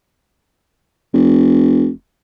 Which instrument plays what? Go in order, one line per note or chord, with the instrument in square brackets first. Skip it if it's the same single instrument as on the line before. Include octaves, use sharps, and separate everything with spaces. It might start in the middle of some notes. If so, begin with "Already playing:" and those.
[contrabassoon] F1